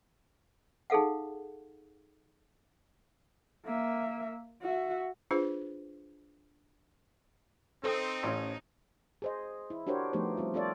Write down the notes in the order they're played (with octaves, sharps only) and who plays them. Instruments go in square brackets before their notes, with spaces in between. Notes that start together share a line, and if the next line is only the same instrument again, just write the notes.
[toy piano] D#4 G#4 A4 F5 F#5
[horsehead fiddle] A#3 E5
F#4 E5
[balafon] D4 F4 G#4 B4 C5
[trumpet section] C4 [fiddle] D#4 [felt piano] A4 C5 D#6
[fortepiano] A1 C#4
[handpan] G#4 C5 D#5
E4
D4 F#4 G4 A#4 C5 C#5
F3 A3 B3 D#4 G4 C5
G3 C4 F4
C4 F4 A4 C#5 D5